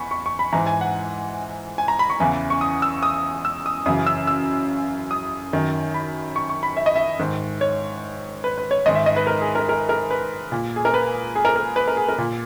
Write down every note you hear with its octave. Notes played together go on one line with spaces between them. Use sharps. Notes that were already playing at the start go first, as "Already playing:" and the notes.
Already playing: E2 B5 C#6
C#6
C#6
B5
G#2 E3 A#5
G#5
F#5
G#5
A#5
B5
C#6
E2 C#3 E3
C#6
D#6
E6
D#6
E6
D#6
F#2 C#3 E3 D#6
E6
E6
D#6
F#2 D#3
B5
C#6
C#6
B5
E5
D#5
E5
G#2 D#3
C#5
B4
B4
C#5
G#2 D#3 D#5
E5
D#5
B4
A#4
G#4
A#4
A#4
A#4
B4
A#2
G#4
A#4
B4
G#4
A#4
A#4
B4
A#4
G#4
A#4
A#2